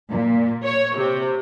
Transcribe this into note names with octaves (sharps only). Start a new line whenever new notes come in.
A#2
C#5
C3